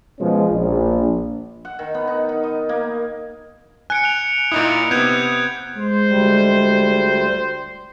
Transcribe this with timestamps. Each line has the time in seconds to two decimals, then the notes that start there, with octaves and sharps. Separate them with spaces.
0.19 B2 F3 G#3 C#4
0.51 A#1
1.65 F#5
1.79 D#3
1.94 B3
2.07 D#4
2.29 D#4
2.44 D#5
2.69 A#3
3.90 G#5 F#6 C#7 D7
4.04 F#6 F7
4.52 A#2 D#4 E4 D#6
4.91 C3 B3 G6 G#6
5.77 G#3 C5
6.08 D2 G3